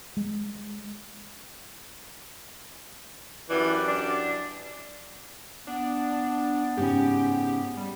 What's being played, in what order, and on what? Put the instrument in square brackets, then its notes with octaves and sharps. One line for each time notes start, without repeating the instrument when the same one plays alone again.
[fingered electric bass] G#3
[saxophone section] F#2 G4 D5 [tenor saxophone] E3
[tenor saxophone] D4
[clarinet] B3 [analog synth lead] D4
[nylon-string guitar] G#2 C#3 C#4 [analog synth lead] G4
[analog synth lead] G3